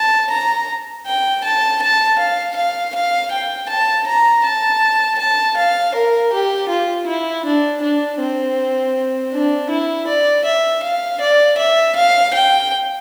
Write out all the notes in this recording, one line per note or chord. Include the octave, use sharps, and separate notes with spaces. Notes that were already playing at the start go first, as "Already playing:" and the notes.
Already playing: A5
A#5
G5
A5
A5
F5
F5
F5
G5
A5
A#5
A5
A5
F5
A#4
G4
F4
E4
D4
D4
C4
D4
E4
D5
E5
F5
D5
E5
F5
G5